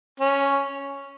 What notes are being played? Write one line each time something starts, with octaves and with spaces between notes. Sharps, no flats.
C#4